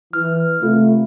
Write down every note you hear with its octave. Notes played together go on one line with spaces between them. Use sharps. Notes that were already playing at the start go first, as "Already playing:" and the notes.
E3 F6
C3 A3 F4